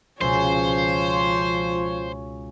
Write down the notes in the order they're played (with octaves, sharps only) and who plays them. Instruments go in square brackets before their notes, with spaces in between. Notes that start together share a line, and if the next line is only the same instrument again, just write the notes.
[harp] C#2 B2 [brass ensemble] F3 F4 [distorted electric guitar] C5 [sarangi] C#5